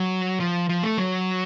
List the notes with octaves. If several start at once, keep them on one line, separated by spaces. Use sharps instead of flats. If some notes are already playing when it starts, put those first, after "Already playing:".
Already playing: F#3
F3
F3
A3
F#3